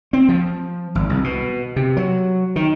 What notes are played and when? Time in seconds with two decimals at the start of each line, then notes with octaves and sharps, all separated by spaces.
0.13 C4
0.29 F3
0.95 G#1
1.10 C2
1.24 B2
1.76 C3
1.97 F#3
2.56 D#3